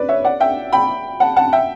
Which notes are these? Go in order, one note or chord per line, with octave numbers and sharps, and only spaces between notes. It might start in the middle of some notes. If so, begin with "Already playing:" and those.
Already playing: B4 D5
C#5 E5
D5 F#5
E5 G5
G5 B5
F#5 A5
F#5 A5
E5 G5